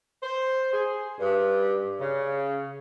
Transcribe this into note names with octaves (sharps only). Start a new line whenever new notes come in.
C5
G#4
G2
C#3